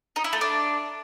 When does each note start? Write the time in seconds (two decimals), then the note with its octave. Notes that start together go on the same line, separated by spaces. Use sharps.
0.16 D#4
0.24 E4
0.33 A3
0.41 D4